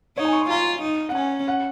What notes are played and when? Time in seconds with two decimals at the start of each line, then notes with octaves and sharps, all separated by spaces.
0.17 D#4 C#5
0.25 G#5
0.33 C#6
0.41 C6
0.50 F4 A#5
0.82 D#4
1.09 F#5
1.15 C#4 G#5
1.48 F#5